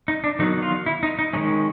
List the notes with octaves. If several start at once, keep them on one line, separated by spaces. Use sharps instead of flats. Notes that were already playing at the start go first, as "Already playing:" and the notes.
D#4
D4
D#3 F#3 B3 D#4
F4
E4
D#4
D#4
D#3 G#3 C#4 D#4